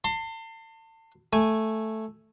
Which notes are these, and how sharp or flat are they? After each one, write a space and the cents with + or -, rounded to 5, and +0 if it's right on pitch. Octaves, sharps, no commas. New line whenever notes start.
A5 +40 C6 +0
A3 +0 G#5 +0